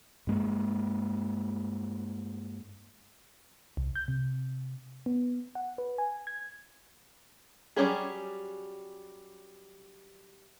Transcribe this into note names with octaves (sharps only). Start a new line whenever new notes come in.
G2 G#3 A#3
C2
G6
C3
B3
F#5
B4
G#5
G#6
F#3 G3 C#4 G4 G#4